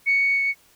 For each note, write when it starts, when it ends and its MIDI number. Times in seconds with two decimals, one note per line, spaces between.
0.06 0.50 97